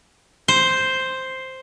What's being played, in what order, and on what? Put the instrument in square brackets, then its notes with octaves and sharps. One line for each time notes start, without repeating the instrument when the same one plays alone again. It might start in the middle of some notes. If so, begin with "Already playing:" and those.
[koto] C5